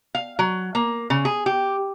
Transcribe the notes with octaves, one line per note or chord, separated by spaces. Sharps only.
F5
F#3
A#3
C#3
G#4
G4